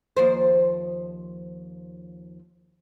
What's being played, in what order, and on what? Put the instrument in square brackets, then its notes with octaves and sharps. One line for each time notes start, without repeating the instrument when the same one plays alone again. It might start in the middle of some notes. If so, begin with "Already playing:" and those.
[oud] D#2 F3 C5